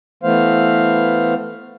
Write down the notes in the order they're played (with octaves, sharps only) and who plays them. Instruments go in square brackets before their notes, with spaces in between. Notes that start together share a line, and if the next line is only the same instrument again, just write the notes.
[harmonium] E3 A3 B3 C5 F5